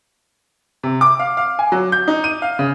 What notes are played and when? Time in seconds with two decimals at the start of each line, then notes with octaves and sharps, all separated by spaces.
0.83 C3
1.01 D6
1.19 F5
1.37 F5
1.59 G#5
1.72 F#3
1.92 G6
2.08 D#4
2.24 D#7
2.42 F5
2.59 C#3